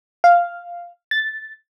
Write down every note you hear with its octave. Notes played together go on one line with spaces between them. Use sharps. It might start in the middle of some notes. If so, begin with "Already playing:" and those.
F5
A6